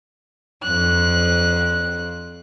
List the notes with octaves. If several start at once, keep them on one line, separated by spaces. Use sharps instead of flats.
F2 F#6